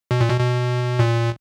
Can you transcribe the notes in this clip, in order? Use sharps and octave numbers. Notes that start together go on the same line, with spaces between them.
B2
A#2
B2
B2
A#2